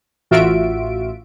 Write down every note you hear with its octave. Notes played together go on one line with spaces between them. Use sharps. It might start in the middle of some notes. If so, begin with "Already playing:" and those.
A1 F4 F#4 E5 D7